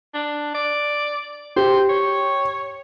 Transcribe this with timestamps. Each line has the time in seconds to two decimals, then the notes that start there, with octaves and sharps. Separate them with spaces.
0.14 D4
0.54 D5
1.56 G4 C5
1.89 C#5